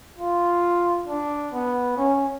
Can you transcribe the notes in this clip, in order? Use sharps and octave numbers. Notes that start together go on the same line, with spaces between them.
F4
D4
B3
C#4